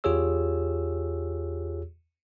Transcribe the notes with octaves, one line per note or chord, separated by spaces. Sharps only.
E2 F4 G4 G#4 C#5 E6